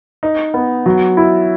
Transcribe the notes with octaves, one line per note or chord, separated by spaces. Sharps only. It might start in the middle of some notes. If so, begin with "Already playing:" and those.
D#4
B3
F#3
E4